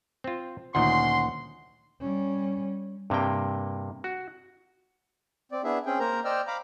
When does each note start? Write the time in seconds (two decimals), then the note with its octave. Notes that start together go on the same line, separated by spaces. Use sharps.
0.24 C4 F4
0.75 D2 A#2 D#3 C#4 F#5 C6
2.01 G3 C#4
3.10 G2 C3 A#3 G5
4.04 F#4
5.52 C4 D5
5.64 B3 D4 E4 G#4 E5
5.86 C4 C#4 G#4 G5
5.99 A#3 A#4 C5 A#5
6.25 C5 D5 D#5 G5 E6 F6
6.47 F5 A#5 B5 D6